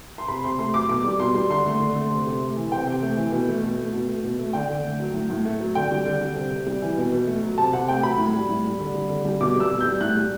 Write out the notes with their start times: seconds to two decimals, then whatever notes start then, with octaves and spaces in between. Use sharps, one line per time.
0.18 C6
0.28 C3 B5
0.44 C3 C6
0.59 A3 C6
0.73 F#3 D6
0.89 B2 D6
1.04 G3
1.19 B2 C6
1.34 G3
1.50 D3 C6
1.65 A3
1.80 D3
1.96 A3
2.10 C3
2.27 C3
2.41 A3
2.57 E3
2.72 C3 G5
2.87 C3
3.02 A3
3.17 E3
3.32 B2
3.48 A3
3.62 B2
3.77 A3
3.94 B2
4.08 A3
4.24 B2
4.39 A3
4.53 D3 G5
4.69 D3
4.84 A3
5.00 F#3
5.14 A2
5.30 A2
5.45 A3
5.60 F#3
5.75 D3 G5
5.91 G3
6.06 D3
6.21 G3
6.36 C3
6.51 C3
6.67 G3
6.82 E3
6.98 B2
7.12 B2
7.27 A3
7.42 F#3
7.58 C3 A5
7.73 C3 F#5
7.88 A3 G5
8.03 F#3 B5
8.18 A2
8.34 G3
8.49 A2
8.64 G3
8.79 D3
8.94 G3
9.09 D3
9.25 G3
9.41 B2 D6
9.55 G3 E6
9.70 B2
9.81 G3 G6
10.01 A2 F#6
10.17 G3